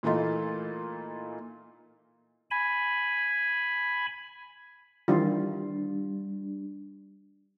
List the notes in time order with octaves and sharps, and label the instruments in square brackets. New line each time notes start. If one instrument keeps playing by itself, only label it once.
[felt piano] A#2 E3 A3 D#4 F4
[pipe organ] G#5 B5
[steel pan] D#3 E3 F4 [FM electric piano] G3 D4